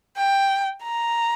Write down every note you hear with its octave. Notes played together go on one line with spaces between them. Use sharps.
G5
A#5